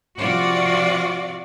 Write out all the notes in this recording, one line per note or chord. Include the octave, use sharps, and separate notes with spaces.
C3 F3 F4 F#4 D5